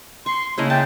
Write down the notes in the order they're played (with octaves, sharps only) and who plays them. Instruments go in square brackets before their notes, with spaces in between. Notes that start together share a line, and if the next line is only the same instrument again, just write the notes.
[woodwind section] C6 [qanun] C#6
[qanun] C#3 A#3 D#5 [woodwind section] A3 D4 E4
[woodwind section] C#4 E5 G5 [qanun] A5